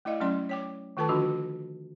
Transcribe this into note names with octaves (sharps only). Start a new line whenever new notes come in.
A3 E4 D5 D#5 F5
F#3 A3 C#4 D5 C6
C#5 G5 D6
D#3 A3 F4 A4 B4 A5
D3 F3 D4 F4 F#4